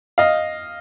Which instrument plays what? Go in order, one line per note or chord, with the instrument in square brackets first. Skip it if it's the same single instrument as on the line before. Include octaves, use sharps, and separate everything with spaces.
[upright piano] D#5 F5